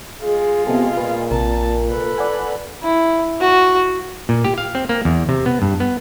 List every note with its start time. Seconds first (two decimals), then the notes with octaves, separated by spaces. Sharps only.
0.23 G#3 F4 G#4
0.67 C3 B3 A4
0.97 A#2 B4
1.31 A#1 C3 A#4 A5
1.88 A4 B4
2.18 D5 F#5 G#5
2.83 E4
3.41 F#4
4.29 A#2
4.44 G4
4.58 F5
4.75 C4
4.89 A#3
5.05 E2
5.29 C3
5.46 B3
5.62 G2
5.80 B3